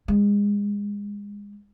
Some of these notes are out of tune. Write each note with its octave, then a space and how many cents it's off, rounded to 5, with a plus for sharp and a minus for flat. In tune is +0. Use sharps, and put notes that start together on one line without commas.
G#3 -30